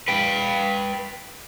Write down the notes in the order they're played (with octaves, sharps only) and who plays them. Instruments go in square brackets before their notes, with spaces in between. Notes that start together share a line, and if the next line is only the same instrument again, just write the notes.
[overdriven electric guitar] B4 G5